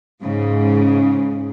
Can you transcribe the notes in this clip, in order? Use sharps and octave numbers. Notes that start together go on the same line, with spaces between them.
G#2 C#3